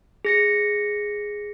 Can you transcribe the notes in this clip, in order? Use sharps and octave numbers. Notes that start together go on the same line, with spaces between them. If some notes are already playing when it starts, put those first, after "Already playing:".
G#4 A#6 C#7